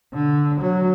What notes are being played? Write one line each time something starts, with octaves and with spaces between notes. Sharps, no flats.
D3
F#3